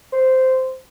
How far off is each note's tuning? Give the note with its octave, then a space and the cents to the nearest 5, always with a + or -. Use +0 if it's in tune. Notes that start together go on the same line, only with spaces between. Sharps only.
C5 -10